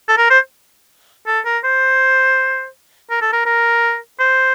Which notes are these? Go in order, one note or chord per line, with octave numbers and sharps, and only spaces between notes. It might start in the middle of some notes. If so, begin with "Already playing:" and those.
A4
A#4
C5
A4
A#4
C5
A#4
A4
A#4
A#4
C5